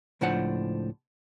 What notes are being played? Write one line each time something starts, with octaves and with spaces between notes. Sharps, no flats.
C#2 A2 F3 D4 C5 F#5